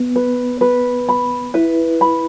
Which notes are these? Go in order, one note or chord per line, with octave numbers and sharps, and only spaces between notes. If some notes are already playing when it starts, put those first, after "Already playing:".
Already playing: B3
B4
B4
B5
E4 B4
B5